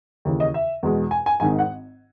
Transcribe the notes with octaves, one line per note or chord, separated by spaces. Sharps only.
D#2 C#3 E3
D#5
E5
E2 B2 G#3
G#5
G#5
G#1 G#2 D#3 G#5
F#5